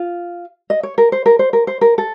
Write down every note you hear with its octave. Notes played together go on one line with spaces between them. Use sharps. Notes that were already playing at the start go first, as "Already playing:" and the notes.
Already playing: F4
D#5
C#5
A#4
C5
A#4
C5
A#4
C5
A#4
A4